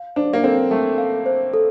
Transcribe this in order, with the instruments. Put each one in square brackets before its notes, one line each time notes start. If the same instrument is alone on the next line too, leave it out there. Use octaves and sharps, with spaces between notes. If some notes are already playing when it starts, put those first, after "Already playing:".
Already playing: [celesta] F5
[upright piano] D4 [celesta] C5
[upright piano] A#3
[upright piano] C4 [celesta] A4
[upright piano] A3 [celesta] A4
[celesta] F5
C5
A4